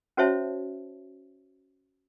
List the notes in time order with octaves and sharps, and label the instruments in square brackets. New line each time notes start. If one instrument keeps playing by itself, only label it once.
[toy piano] C#4 F#4 C5 C#5 E5 A5